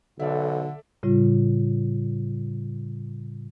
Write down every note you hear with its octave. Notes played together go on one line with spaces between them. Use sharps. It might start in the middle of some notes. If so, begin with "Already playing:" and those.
B1 D3 A4 D5 E5
A2 C#3 G3 F4